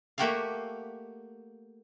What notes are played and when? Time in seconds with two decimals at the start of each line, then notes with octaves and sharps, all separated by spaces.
0.18 A3 A#3 F#4 G4 E5 F5